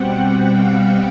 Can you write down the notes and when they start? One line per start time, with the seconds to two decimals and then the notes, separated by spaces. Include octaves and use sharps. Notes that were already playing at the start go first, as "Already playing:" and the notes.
Already playing: B2 G3 C4 F#5 G5
0.52 F5